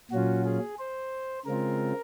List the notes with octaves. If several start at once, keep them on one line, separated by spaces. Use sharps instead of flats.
A#2 F#3 C#4 F4 F#4
G#4
C5
C#3 G#3 C4 F4 A#4